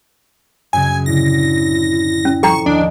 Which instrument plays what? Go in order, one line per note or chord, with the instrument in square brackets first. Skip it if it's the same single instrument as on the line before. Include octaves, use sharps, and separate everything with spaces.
[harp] F#2 C#3 [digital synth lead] G#5
[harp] A2 D3 [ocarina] E4 [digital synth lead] A#6
[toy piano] C#4
[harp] F3 [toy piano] A4 G5 A#5 [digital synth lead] C#6
[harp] D#2 [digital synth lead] D4